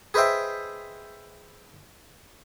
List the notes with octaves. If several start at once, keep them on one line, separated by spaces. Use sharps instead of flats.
G#4 B4 C5 D#5 E5 G5